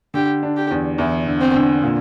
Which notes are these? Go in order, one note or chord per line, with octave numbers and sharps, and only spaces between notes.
D3 G4
D4
G4
E2
E2 E4
D3
C4
D3
A#2